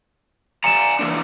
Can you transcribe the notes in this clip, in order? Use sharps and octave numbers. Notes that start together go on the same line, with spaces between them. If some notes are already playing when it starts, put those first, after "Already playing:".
D5 G#5 A#5 C#7 E7
E3 A#3 D4